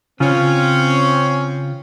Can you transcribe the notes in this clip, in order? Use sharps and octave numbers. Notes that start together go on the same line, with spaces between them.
C#3 C4 C#4 F4